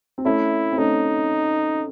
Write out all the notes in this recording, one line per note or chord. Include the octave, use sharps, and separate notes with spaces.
C4
A3 C#4 E4
C4
A3 C#4 D#4